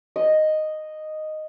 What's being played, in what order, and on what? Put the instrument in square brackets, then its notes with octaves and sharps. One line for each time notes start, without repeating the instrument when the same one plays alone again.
[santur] D#5